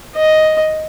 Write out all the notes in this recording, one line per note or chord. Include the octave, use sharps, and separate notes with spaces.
D#5